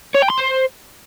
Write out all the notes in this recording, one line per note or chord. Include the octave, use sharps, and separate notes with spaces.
C#5
G5
C6
C5